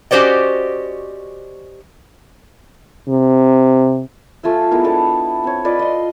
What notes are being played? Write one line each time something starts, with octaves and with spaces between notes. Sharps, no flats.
C#4 F#4 G4 C5 D5 D#5
C3
A3 F4 G#5 E6
G#3 B3 E4 A#4
B3 D4 A4 D6
C4 C#5
F4 B4 D5 D#5
D#5 C6